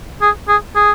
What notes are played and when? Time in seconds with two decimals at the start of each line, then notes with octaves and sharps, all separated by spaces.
0.22 G#4
0.48 G#4
0.76 G#4